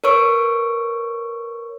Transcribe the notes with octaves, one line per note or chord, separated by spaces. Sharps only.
A#4 B4 C#5 C#6 E6 D7